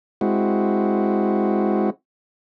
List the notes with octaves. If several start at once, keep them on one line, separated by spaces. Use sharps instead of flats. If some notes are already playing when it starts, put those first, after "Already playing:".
G#3 C4 E4 F#4